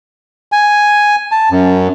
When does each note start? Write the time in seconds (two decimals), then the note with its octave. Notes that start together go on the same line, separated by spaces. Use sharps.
0.52 G#5
1.32 A5
1.51 F#2